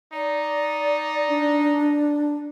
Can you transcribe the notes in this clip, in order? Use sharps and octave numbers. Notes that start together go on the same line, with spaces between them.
D#4 D5
D4